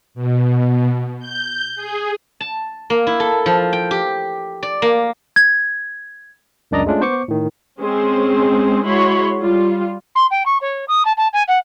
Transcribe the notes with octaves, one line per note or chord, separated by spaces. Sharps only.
B2
G6
G#4
A5
A#3
E4
A4
F3
G5
G4
D5
A#3
G#6
C#2 F#2 D4 D5 D#5 A#5
G#3 A3 C#4 D4 F4
B3 C5 C#6 D6 C#7
A2 D#3
G#3 C4 C#4 G#4 C5
G#3 E4 F#4 C#5 B5 C6
G3 F4
C6
G5
C#6
C#5
D#6
A5
A5
G#5
F#5